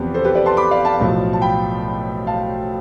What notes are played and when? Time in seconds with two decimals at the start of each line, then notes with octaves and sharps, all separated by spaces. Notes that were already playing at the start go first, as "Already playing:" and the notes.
Already playing: E2 C3 F3 B3 G4 B4
0.14 A4 C5
0.24 G4 B4
0.35 B4 D5
0.46 A5 C6
0.57 B5 D6
0.71 D5 F5
0.85 F5 A5
1.00 B1 A2 F3
1.33 A5
1.42 G5 B5
2.27 F5 A5